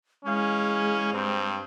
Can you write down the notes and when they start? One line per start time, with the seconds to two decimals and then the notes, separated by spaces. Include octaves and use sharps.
0.25 E3 G#3 C#4 G#4 F5
1.13 G2 C4